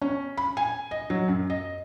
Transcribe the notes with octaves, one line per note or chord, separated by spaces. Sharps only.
C#4
B5
G#5
D#5
F#3
F#2
D#5